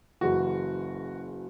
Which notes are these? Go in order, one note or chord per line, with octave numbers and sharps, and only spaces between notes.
F#1 F#2 C#3 E3 F#4